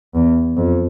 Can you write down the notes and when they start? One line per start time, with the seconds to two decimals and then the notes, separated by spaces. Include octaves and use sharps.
0.15 E2
0.57 F2